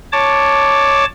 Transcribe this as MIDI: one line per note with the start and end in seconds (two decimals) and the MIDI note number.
0.13 1.05 73
0.13 1.05 81
0.13 1.05 86